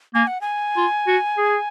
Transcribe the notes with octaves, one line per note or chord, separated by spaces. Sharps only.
A#3 G#5
F#5
G#5
F4
F#4
G#4